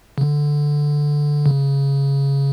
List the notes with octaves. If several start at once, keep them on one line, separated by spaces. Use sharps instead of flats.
C#3
D3
C#3